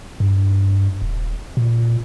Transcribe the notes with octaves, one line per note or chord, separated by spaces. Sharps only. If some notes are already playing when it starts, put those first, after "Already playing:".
G2
D#1
A#2